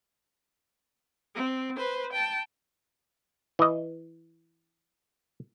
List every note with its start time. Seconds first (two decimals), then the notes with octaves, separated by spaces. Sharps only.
1.35 C4
1.77 B4 C5
2.13 G5 A5
3.59 E3 D#5